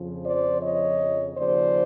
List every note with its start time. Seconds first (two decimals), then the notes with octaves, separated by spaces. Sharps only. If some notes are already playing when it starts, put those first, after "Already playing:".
Already playing: F2 C#3 F3
0.25 C5 D5
0.62 C#5 D#5
1.36 D#2 C#3 F3 C5 D5